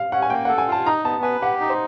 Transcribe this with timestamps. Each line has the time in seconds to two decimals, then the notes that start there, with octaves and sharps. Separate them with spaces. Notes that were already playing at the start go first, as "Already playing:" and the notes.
Already playing: F5
0.12 C#4 F#5
0.22 G#5
0.30 A#3 G5
0.45 F#5
0.49 A4
0.58 G#5
0.67 F4 A5
0.86 D#4 A#5
1.05 B3 A5
1.23 B4 G#5
1.41 G4 F#5
1.61 D#4
1.69 C5